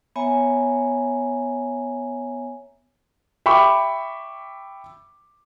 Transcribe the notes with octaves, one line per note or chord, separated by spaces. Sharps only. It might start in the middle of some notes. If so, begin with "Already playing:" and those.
B3 C#5 E5 G#5 A#5
E5 G5 B5 C#6 D6